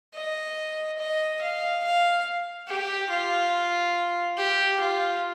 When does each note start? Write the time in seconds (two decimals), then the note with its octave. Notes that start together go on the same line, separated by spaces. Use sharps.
0.14 D#5
0.98 D#5
1.41 F5
1.84 F5
2.68 G4
3.10 F4
4.37 G4
4.80 F4